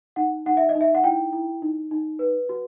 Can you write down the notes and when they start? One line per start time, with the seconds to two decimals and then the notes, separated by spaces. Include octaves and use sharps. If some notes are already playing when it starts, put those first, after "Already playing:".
0.16 D#4 F#5
0.46 D#4 F#5
0.57 E5
0.69 D#5
0.75 D#4
0.81 E5
0.95 F#5
1.04 E4 G5
1.33 E4
1.62 D#4
1.91 D#4
2.19 B4
2.49 F#4